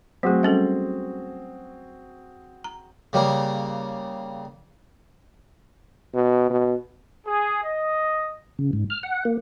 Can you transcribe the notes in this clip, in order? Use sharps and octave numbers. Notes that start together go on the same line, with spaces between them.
F#3 A3 C4 F#4 G#4
G3 C#4 A4
A#5
C#3 G3 A#3
B2
B2
G#4
D#5
C#3
G#2
F6
F#5
A#3